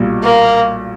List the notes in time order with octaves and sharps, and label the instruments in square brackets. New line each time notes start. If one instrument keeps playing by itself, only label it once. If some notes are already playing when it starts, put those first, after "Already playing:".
Already playing: [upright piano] B1 A#2 G3
[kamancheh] A#3